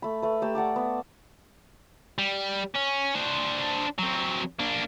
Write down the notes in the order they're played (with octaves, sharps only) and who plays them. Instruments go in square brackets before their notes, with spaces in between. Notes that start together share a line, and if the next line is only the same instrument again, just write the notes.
[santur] A3 B5
A3 B4
A3 G4 A#5 E6
D5 F#5 A5 D6
B3
[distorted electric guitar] G3
C#4
D4 C5
F#3 C4
A#3 D4